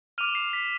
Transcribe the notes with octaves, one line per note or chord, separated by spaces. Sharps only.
D6 F6 D#7 F7
C7
B6